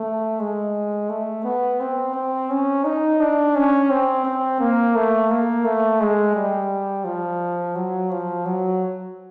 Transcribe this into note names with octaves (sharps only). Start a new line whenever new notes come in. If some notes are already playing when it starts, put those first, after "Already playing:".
Already playing: A3
G#3
A3
B3
C4
C4
C#4
D#4
D4
C#4
C4
C4
A#3
A3
A#3
A3
G#3
G3
F3
F#3
F3
F#3